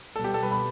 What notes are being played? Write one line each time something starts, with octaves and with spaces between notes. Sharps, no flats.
B2 G3 B3 A4
G4
A4
B4
B5